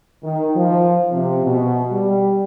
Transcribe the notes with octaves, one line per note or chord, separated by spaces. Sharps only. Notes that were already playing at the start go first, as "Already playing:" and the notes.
D#3
F3
C3
B2
G3